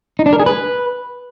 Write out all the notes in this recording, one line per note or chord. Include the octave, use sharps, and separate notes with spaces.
D#4
D4
A#4
G#4
B4